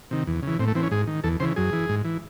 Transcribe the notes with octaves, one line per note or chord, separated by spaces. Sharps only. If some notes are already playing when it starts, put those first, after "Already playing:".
C3 D#3
E2
C#3 E3
A2 C4
A3
E3 C4
C#4
G#2 G#4
D#3
E2 A4
C#3 E3 C5
F#2 G#4
E3
G#2
E3